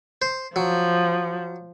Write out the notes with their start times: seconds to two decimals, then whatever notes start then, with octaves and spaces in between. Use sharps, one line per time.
0.22 C5
0.56 F3 F#3